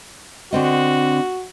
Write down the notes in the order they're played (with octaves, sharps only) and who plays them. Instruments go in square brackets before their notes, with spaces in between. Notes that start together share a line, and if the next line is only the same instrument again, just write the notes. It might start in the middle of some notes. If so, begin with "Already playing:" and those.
[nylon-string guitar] D3 C4 D#5 [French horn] F#4